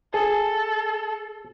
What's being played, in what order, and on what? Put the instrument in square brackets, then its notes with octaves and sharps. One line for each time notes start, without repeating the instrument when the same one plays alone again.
[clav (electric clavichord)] G#4 [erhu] A4